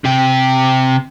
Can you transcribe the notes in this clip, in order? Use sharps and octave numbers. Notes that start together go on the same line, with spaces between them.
C3 G4